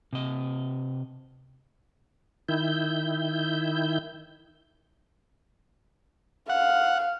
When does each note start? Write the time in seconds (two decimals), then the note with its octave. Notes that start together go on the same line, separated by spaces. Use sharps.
0.13 C3 D#5
2.49 D#3 E4 G6
6.49 F5 F#5